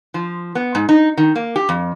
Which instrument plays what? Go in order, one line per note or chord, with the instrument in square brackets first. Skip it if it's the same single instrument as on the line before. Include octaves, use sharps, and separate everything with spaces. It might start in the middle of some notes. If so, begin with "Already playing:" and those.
[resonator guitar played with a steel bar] F3
B3
G#2
D#4
D#3
A#3
G4
F2